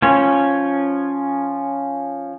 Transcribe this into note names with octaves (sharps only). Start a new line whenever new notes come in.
F3 C#4 C#5